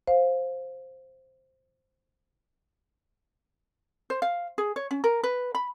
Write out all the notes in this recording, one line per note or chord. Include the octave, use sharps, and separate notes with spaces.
C5 F5
C5
F5
G#4
C#5
C#4
A#4
B4
B5